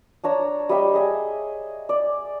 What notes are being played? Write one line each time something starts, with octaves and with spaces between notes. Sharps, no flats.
D4 C#5 A#5 E6
G3 D#5 E5 G5
G#4 D#5 E5
D5